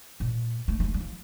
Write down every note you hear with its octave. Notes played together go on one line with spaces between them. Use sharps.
A#2
A3
G3
A3
G3
F3